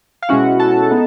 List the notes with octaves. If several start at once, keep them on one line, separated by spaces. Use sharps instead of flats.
F5
B2 G#3 C#4 E4 F#4 F#5
A4 A5
B3 D#4